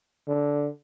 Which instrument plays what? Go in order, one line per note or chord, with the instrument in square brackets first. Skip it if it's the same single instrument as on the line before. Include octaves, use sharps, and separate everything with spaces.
[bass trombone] D3